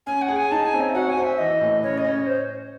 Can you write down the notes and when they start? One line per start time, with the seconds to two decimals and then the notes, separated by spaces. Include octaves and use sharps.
0.07 C#4 G#5
0.22 F#5
0.28 G#4
0.36 G#5
0.51 D#4 A5
0.66 G#5
0.74 C4
0.81 C#5
0.90 E5
0.94 F#4 F#5
1.10 G#5
1.17 C5
1.24 E5
1.38 E3 D#5
1.60 A2
1.83 C#3 C#5
1.98 D#5
2.04 C#4
2.11 C#5
2.26 C5